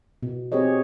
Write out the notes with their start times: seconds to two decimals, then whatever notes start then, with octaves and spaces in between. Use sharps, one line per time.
0.23 B2
0.52 C4 G4 G#4 C#5 D#5